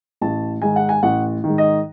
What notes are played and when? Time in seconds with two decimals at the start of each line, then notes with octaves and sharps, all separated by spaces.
0.21 A1 A5
0.62 G#2 D#3 G#5
0.76 F#5
0.89 G#5
1.03 A1 F#5
1.44 G#2 D#3
1.58 D#5